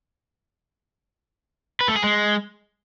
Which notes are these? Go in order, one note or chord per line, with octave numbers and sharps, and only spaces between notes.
B4
A3
G#4
G#3